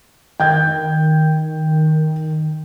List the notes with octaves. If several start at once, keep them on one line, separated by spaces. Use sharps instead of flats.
D#3 G5 G6 G#6